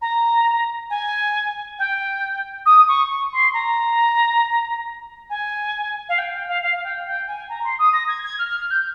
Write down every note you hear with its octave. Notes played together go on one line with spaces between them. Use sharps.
A#5
G#5
G5
D#6
C#6
C#6
C6
A#5
G#5
F5
G5
G5
F5
F5
F5
G5
G5
G#5
A#5
C6
D#6
A#6
G#6
G#6
F6
F6
F6
G6